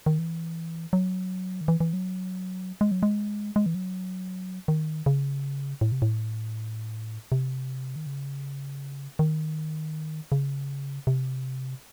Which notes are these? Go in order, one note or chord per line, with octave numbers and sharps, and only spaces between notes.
D#3
E3
F#3
D#3
E3
E3
F#3
G#3
F#3
G#3
G#3
E3
F#3
D#3
C#3
A2
C3
A2
C3
D#3
C#3
D#3
C#3
C3